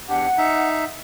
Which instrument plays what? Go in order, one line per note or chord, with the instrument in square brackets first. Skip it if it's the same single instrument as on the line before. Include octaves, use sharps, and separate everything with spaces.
[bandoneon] E2 D4 G4 [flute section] F#5
[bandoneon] D#4 E5